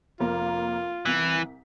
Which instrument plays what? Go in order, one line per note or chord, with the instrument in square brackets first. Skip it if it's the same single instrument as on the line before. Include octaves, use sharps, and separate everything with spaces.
[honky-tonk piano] F1 A#3 A#4 [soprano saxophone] F4
[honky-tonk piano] C2 B6 [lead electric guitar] E3